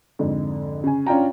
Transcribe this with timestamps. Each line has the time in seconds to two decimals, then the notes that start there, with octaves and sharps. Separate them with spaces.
0.19 F2 G#2 D3
0.84 C#3 G#5
1.07 C#4 D4 F4 G5 A#5